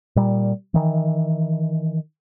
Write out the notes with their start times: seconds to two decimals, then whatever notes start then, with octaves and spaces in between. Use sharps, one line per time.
0.16 A#2 G3
0.74 D#3 E3